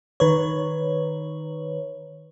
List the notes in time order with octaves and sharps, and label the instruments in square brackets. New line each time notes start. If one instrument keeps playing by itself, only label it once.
[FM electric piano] D#3 B4 C#5